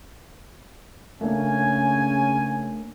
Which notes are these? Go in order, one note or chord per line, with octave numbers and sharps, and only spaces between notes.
C#3 A3 A#3 C#4 D4 G#5